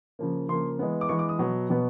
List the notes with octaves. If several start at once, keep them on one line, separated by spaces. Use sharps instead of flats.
C#3 F3 A#3
C#3 F3 A#3 C6
E3 G#3 B3
D6
E3 G#3 B3 C#6
D6
D#6
B2 F#3 B3
B2 F#3 B3